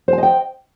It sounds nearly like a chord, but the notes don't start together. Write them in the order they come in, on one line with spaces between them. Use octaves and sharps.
C5 G#5 D#5 G5